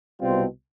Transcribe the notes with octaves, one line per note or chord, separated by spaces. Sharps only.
C2 B2 G3 C4 F4